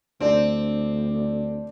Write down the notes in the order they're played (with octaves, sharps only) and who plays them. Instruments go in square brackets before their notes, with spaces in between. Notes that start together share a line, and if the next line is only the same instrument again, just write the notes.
[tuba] D2 [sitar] C4 [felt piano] D4 D5